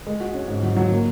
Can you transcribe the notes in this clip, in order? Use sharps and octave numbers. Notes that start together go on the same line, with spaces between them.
G#3
F#4
C#4
G#2
F#3
F#3
A#3